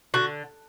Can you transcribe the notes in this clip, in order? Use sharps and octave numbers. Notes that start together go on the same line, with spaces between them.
D3 F#4